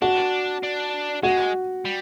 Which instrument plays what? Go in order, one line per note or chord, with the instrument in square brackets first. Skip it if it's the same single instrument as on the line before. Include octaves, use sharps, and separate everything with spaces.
[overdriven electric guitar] D4 [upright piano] F#4
[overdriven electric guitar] D4
[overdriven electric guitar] G#3 [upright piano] F#4
[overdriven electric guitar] G3